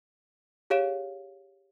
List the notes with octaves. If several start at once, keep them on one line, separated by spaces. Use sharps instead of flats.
G4 G#4 C#5 F5 D7 E7